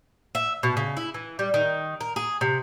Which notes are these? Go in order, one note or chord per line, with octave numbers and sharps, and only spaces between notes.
E5
B2
C#3
E4
E3
G3
D#3
A#4
G#4
C3